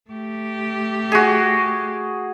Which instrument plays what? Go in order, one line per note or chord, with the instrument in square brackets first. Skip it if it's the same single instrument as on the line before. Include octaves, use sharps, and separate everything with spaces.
[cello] A3 G4
[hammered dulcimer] F#4 G#4